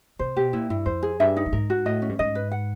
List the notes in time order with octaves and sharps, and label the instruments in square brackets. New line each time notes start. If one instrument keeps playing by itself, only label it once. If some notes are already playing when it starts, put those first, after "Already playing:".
[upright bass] C3 [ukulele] C5
[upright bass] B2 [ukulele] G4
[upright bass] A#2 [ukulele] E4
[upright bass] G2 [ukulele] E4
[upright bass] F2 [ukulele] C5
[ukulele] G#4
[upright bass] G2 [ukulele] E5
[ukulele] D#4
[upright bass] G2
[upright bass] G#2 [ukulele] A#4
[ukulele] F#4
[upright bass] A2 [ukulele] D#5
[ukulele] C#4
[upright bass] G2
[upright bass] G#2 [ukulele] D#5
[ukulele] B4
F#5